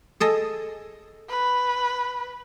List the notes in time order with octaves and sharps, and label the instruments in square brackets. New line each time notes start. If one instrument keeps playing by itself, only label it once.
[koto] G#4 A4 D#5
[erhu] B4